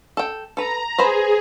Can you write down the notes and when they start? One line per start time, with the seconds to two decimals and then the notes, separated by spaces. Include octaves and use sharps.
0.17 A4 G5
0.57 A4 B4 A#5
0.98 G#4 B4 C5 B5